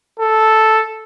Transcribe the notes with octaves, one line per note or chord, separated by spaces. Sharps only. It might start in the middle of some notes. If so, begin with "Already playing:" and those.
A4